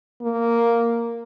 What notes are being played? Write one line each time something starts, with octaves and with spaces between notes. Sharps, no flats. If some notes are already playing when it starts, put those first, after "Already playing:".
A#3